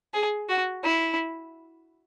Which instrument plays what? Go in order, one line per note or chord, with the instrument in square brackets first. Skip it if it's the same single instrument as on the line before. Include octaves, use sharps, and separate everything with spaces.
[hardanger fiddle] G#4
F#4
E4